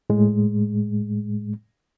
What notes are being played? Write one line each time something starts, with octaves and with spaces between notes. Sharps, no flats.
A2 G#3